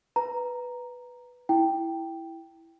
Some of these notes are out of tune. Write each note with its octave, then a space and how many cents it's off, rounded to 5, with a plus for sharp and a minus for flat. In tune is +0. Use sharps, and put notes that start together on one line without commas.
B4 +0 A#5 +0
E4 +0 G5 +0